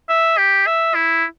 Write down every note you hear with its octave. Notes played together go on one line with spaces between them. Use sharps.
E5
G4
E5
E4